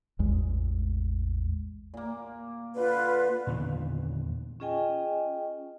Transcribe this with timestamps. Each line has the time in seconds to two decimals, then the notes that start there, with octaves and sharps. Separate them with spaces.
0.19 A1 E2 G#3
1.94 A#2 A#3
2.76 D3 F4 B4
3.47 E2 A#2 D3 D#3
4.60 C#4 F4 G#4 D#5 G5 G#5